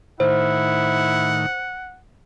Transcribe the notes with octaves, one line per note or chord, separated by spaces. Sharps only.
A2 D#3 E4 C5 F#5